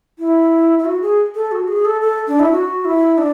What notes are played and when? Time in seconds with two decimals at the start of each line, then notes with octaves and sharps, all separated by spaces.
0.19 E4
0.79 E4
0.85 F#4
1.02 G#4
1.35 A4
1.52 F#4
1.68 G#4
1.85 A4
2.02 A4
2.28 D4
2.40 E4
2.52 F#4
2.85 E4
3.18 D4